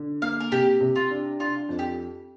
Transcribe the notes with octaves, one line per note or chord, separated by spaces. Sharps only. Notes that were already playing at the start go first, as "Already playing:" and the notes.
Already playing: D3
A#3 F5
A#4
C3 G4
C3
F4
D4
D4 F4
F2
G4